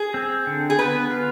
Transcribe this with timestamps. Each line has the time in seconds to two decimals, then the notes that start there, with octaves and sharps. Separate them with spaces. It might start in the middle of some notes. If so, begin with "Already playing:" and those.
Already playing: G#4
0.14 C4
0.47 D3
0.70 G#4
0.79 B3 B4
1.11 F4